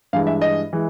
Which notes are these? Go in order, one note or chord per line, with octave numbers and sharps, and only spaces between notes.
G2 E3 G#3 F5
E5
D#5
E3 G#3